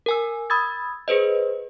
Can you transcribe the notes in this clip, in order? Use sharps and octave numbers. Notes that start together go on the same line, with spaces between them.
A#4 G#5 E6
B5 D#6 E6 G#6 A6
G#4 B4 C5 D#5